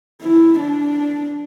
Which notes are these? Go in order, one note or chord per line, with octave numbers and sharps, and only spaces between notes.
E4
D4